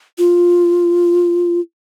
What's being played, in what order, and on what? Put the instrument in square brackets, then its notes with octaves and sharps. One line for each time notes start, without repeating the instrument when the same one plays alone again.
[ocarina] F4